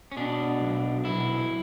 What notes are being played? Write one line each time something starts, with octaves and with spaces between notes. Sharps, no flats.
C#4
B2 D4
B1
B1 E4